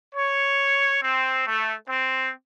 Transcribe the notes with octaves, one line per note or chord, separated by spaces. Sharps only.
C#5
C4
A3
C4